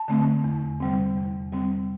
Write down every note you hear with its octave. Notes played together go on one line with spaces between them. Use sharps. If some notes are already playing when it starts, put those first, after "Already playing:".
Already playing: A5
D3 A3 C4
E2
C3 G3 C4
E2
C3 G3 C4